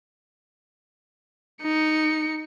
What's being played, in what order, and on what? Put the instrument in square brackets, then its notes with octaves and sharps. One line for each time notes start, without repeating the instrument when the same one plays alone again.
[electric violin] D#4 C#7